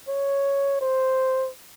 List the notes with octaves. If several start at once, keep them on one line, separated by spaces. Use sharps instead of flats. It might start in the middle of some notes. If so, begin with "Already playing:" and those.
C#5
C5